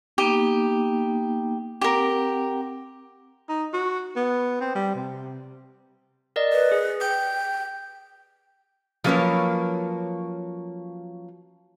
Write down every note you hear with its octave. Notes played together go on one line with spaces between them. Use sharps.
A#3 B3 D#4 G4
C4 G4 A#4 F#5
D#4
F#4
B3
C4
G3
C3
A#4 D5 D#5
B4
G#4
G5 G6
F3 F#3 A#3 C#4 B4 C#5